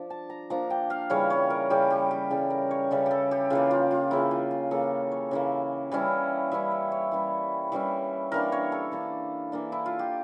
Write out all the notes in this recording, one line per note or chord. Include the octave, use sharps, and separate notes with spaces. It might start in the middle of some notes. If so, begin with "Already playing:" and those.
Already playing: F3 D4
A5
A#5
F3 A#3 D4 A#5
G5
F5
C#3 E3 G3 C#4 C#5
C#5
A#4
C#3 E3 G3 C#4 G4
G4
G4
C#3 E3 G3 C#4 A4
A#4
C#5
C#3 E3 G3 C#4 A4
G4 A4
G4
C#3 E3 A#3 F4
F4
F4
C#3 E3 A#3 E4
F4
F4
C#3 E3 A#3 A4
C#5
C#3 E3 A#3
E3 G3 C#4 E4
E3 G3 C#4 E4 E5
E5
C#5
E3 G3 C#4 E4
E3 G3 C#4 E4
E3 A#3 D4 A#4
C#5
A4
E3 A#3 D4
E3 A#3 D4
E4
F4
G4